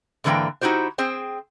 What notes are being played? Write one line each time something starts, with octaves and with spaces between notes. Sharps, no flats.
G#2 D3 E3 A#3 D4 G5
D#4 E4 F#4 G4 C5
C4 G#4 C5 G5